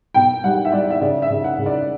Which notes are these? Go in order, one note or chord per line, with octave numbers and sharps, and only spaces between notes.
B2 G5
G3 F#5
E5
G3 D5
E5
C#3 D5
E5
C#3
F#5
C#3
D5